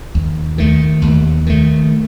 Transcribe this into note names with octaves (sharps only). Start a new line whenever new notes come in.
D#2
D#3 A3
D#2
D#3 A3